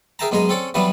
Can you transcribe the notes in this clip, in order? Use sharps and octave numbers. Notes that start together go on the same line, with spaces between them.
G#4 A#4 E5 G5 A5 A#5
F#2 B2 G#3 G#4 G#5 A#5
C4 C#4 A4 C#5 D5
E3 F#3 G3 B3 D4 E4